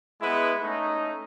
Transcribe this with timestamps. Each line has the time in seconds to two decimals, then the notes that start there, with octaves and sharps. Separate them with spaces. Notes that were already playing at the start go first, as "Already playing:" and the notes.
0.22 G#3 B3 E4 B4 F#5
0.62 A3 C#4 D#4